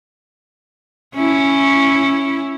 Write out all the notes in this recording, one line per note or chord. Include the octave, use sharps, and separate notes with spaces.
C#4 E4